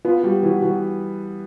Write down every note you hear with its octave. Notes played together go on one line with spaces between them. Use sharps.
B3 F4
G3 F#4
E3 F#4
E3 F#4